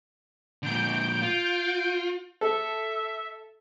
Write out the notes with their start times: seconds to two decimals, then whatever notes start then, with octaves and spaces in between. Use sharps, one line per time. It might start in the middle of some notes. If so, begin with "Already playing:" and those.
0.63 A#2 D3 G6 D7
1.21 F4
2.41 A4 E5